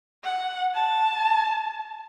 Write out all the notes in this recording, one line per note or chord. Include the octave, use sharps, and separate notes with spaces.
F#5
A5